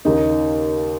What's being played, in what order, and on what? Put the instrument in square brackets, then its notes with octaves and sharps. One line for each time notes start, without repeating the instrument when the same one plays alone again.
[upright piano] D#2 C#3 A#3 D#4